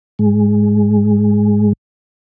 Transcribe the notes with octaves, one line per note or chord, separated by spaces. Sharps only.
G#2 G#3